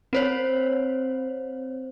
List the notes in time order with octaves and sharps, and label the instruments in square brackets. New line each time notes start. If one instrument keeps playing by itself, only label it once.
[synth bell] C4 C5 C#5